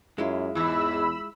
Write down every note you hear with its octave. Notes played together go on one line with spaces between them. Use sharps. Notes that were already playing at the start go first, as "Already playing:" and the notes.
F#2 G#3 E4 F4
E2 G#2 E3 B5 E6